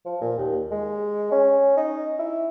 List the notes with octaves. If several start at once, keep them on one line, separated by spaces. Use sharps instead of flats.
F3
A#2
D#2
G#3
C#4
D#4
E4